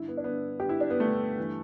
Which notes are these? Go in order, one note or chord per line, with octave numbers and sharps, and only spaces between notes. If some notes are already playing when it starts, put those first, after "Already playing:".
Already playing: G2 D3 E4
B3
D4
G2 D3 B3
G2 D3 G4
E4
D4
B3
G2 D3 A3
G2 E3